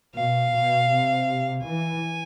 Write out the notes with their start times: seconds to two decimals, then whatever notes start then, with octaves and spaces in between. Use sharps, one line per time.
0.15 B2 F5
0.53 B2
0.90 C3
1.64 E3 G#5